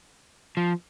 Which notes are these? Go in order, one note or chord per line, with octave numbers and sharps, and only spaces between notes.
F3